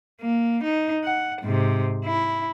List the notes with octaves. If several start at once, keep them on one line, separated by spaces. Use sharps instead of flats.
A#3
D#4
F#5
G#2 C3
E4